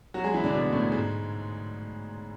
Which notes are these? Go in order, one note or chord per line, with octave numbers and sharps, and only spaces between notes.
F#3 F#4
G#3 G#4
E3 E4
D3 D4
B2 B3
A2 A3
G#2 G#3